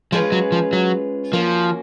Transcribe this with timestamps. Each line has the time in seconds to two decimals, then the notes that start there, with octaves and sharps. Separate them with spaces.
0.12 F3 G#3 C#4 F4 G#4 B4
0.32 F#3
0.52 F3
0.73 F#3
1.33 F3 A#3 C#4 F#4